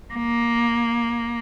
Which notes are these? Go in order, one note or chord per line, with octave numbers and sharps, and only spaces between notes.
A#3